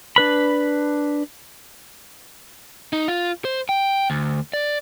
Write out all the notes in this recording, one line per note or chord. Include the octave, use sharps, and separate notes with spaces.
D4 B4 B5
D#4
F4
C5
G5
D2
D5